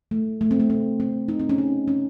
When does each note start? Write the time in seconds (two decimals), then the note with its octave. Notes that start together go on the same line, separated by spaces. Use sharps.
0.11 A3
0.41 A3
0.51 C4
0.60 A3
0.70 C4
1.00 C4
1.28 D#4
1.40 C4
1.49 C#4
1.58 D#4
1.88 C#4